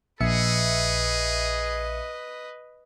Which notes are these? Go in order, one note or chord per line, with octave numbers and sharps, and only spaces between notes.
A#1 G#4 B4 D#5 E5 C#7